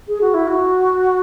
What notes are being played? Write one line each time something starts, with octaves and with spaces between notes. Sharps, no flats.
G#4
F#4
E4
F#4